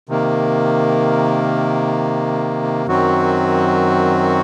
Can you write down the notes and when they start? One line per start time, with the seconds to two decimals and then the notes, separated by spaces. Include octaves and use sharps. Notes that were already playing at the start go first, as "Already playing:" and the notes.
0.09 C3 D#3 A#3
2.87 F#2 D#3 F#3 C4 F#4